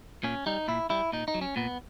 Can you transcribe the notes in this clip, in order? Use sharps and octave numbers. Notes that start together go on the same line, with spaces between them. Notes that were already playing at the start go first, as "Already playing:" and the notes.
A#2 C#4
G3 D#4
A#2 E4
G3 E4
A#2 D#4
D#4
F#3
C#4
A#2 B3